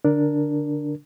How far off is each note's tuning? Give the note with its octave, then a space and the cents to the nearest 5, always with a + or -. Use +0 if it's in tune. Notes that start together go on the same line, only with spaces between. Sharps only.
D3 -10 D4 +0 A#4 +0